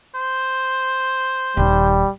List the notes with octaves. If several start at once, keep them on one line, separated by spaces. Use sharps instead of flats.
C5
D#1 D#3 G3